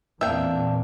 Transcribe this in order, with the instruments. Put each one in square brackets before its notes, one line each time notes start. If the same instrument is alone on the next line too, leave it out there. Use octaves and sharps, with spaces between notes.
[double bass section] E2 A#2 C4 [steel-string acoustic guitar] A#3 D4 [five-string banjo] E5 G5